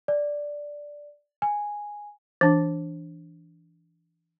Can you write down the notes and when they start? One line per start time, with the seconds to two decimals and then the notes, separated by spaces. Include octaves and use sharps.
0.08 D5
1.42 G#5
2.41 E3 D4